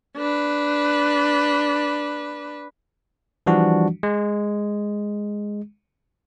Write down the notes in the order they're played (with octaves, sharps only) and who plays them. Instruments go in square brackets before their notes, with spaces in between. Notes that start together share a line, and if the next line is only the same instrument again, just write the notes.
[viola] D4 B4
[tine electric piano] E3 F3 G3 D4 F#4
G#3